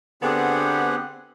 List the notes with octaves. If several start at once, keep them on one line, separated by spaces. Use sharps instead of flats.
D3 B3 C4 G4 G#4 F#5